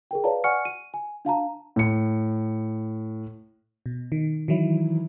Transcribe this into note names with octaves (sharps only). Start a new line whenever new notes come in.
G#4 A#4 G5
B4 C#5 D5 F5 A5 A#5
D5 F#5 G#5 C#6 F6 C#7
D#7
G#5
D4 F5 A5 A#5
A2 C#7
B2
D#3
D#3 E3 F#3 E4